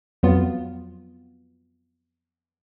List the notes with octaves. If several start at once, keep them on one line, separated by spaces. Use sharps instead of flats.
F2 F#3 B3 F4